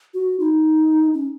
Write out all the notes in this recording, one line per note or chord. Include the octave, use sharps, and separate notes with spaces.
F#4
D#4
C#4